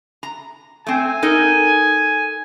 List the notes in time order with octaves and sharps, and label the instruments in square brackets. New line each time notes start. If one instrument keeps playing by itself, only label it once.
[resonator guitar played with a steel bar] A#5
[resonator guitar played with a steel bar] A3 C4 [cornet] G#5
[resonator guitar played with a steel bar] D#4 A4 A#4